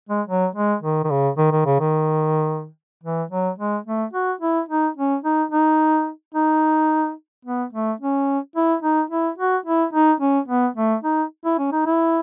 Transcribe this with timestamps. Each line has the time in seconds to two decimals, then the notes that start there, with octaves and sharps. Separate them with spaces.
0.09 G#3
0.27 F#3
0.55 G#3
0.83 D#3
1.04 D#3
1.10 C#3
1.37 D#3
1.51 D#3
1.66 C#3
1.80 D#3
3.04 E3
3.30 F#3
3.58 G#3
3.86 A3
4.13 F#4
4.41 E4
4.69 D#4
4.97 C#4
5.24 D#4
5.51 D#4
6.34 D#4
7.45 B3
7.73 A3
8.00 C#4
8.56 E4
8.83 D#4
9.10 E4
9.38 F#4
9.65 E4
9.93 D#4
10.20 C#4
10.48 B3
10.76 A3
11.04 D#4
11.45 E4
11.58 C#4
11.72 D#4
11.86 E4